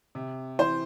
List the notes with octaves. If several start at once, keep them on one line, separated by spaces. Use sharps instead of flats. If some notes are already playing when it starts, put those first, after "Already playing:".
C3
E3 C5